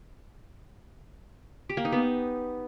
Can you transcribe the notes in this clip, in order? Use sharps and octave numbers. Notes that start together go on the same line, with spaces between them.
G4
A#3
D#4
B3